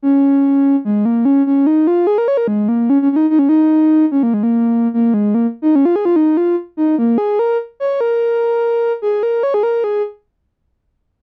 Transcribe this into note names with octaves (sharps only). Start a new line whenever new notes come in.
C#4
G#3
A#3
C#4
C#4
D#4
F4
G#4
A#4
C#5
A#4
G#3
A#3
C#4
C#4
C#4
D#4
D#4
C#4
D#4
C#4
A#3
G#3
A#3
A#3
G#3
A#3
D#4
C#4
F4
G#4
F4
D#4
F4
D#4
A#3
G#4
A#4
C#5
A#4
G#4
A#4
C#5
G#4
A#4
G#4